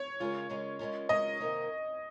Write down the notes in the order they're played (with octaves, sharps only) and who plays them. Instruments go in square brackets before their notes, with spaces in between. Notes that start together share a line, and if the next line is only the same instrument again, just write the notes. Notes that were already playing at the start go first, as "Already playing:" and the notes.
Already playing: [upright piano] C#5
[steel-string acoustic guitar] C#3 G#3 C#4 F4 A#4
C#3 G#3 C#4 F4 A#4
C#3 G#3 C#4 F4 A#4
[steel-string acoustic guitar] C#3 G#3 C#4 F4 A#4 [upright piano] D#5
[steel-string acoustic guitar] C3 D#3 A#3 D#4 A#4